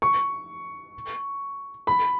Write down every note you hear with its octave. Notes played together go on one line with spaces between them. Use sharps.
C#6
B5